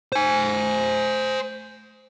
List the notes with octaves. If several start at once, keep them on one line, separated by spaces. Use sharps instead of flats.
C5 G#5